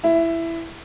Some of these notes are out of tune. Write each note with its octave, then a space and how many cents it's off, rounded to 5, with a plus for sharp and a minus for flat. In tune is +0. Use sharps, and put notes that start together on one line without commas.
E4 +10